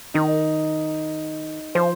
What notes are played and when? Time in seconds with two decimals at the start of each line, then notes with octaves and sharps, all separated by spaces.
0.14 D#3 D#4
1.75 F3 C5